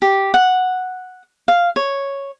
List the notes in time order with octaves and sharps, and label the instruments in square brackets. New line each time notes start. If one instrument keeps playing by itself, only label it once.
[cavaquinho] G4
F#5
F5
C#5